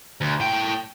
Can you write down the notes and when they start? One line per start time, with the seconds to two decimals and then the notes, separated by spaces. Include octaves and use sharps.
0.21 D2
0.40 A2 G5